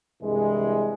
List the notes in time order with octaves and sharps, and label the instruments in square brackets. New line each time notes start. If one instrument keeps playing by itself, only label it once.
[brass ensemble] C2 G2 E3 G#3